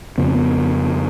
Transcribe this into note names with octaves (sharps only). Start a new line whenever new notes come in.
F2 C#3 B3
C4
B3